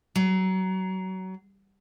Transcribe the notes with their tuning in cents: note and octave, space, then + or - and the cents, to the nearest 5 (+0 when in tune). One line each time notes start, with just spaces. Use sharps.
F#3 +25